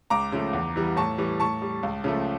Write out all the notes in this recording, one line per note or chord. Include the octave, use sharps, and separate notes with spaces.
C#2 A#5 D6
C#3 F3 A3
E2
E3 G3
A2 A5 C#6
E3 G3
A2 A5 C#6
G3
C#2
C#3 F3 A3